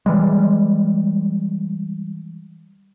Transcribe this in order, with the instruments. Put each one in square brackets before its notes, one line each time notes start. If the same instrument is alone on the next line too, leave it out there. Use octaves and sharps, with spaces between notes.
[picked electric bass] E3 G3 G#3